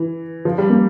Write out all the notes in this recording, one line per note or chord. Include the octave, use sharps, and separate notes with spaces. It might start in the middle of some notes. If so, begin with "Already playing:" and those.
Already playing: E3
F3
G3
A#3